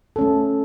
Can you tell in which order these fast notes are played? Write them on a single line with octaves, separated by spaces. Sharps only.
A4 C#4 A3